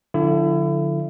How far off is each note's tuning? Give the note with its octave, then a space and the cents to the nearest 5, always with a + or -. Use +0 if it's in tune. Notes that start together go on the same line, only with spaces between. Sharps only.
D3 +0 F3 +45 E4 +35